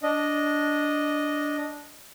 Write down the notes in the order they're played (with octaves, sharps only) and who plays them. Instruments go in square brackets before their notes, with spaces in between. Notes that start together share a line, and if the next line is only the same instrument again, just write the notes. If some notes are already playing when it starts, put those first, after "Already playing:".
[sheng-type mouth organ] D4 D#5